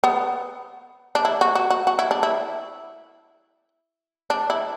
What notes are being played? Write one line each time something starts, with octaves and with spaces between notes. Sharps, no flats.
B3
D4
E4
F#4
F#4
F#4
F#4
E4
D4
E4
D4
E4